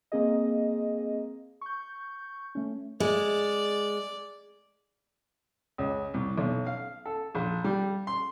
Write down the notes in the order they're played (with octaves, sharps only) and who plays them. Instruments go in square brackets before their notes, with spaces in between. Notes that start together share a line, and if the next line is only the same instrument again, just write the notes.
[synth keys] A#3 C4 G#4 D#5
C#6 G6
A3 C#4
[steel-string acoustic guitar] G#3 [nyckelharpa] D5
[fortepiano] C#2
C2
B1
F5
A4
A#1
G3
C6